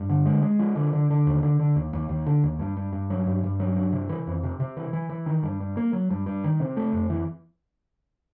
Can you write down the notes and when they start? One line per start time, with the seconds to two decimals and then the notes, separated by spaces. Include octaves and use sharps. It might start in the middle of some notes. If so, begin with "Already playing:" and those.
Already playing: G2
0.09 D3
0.26 G#3
0.42 G#3
0.59 F3
0.76 D3
0.93 D3
1.10 D3
1.26 D#2
1.43 D3
1.60 D3
1.76 D#2
1.93 D#2
2.09 D#2
2.26 D3
2.44 D#2
2.59 G2
2.77 G2
2.92 G2
3.10 F#3
3.26 G2
3.44 G2
3.60 F#3
3.77 G2
3.93 C3
4.09 E3
4.27 F2
4.43 C3
4.60 C3
4.77 E3
4.93 E3
5.09 E3
5.26 D#3
5.43 G2
5.60 G2
5.77 A#3
5.93 F#3
6.10 G2
6.26 G2
6.44 D#3
6.60 C3
6.77 A3
6.93 F2
7.10 E3